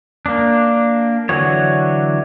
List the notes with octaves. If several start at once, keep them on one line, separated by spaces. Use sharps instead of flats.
A#3 D4
D3 E3 F#3 F#4 C#5